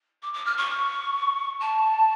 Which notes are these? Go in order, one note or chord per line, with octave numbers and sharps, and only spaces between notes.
D6
D6
F6
C#6
A5